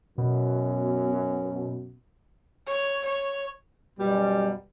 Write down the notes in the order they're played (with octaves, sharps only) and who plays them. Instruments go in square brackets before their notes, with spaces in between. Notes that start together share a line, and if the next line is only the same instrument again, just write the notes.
[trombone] F#2 [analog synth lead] B2
[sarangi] C#5
C#5
[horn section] F#2 B2 G3